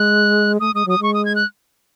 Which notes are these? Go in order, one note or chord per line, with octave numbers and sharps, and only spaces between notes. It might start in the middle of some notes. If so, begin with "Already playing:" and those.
Already playing: G#3 F#6
A3 D#6
G#3 D#6
F#3 D#6
G#3 C#6
D#6
G#6
F#6